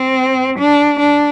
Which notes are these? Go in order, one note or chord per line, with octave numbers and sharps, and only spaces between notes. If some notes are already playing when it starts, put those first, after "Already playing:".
Already playing: C4
D4
D4